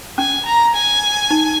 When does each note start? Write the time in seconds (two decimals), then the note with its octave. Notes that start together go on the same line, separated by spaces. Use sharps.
0.18 C#4 G#5
0.46 A#5
0.75 G#5
1.31 D#4